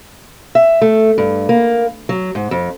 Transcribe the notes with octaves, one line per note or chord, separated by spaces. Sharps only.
E5
A3
G2
A#3
F#3
G#2
F2